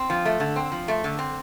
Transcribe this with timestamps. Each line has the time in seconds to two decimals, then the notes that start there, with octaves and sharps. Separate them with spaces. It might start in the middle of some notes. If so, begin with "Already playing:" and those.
Already playing: C4
0.10 F3
0.25 A3
0.40 D3
0.56 C4
0.72 F3
0.88 A3
1.04 D3
1.19 C4